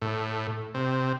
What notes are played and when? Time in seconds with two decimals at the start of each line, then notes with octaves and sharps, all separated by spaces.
0.01 A2
0.74 C3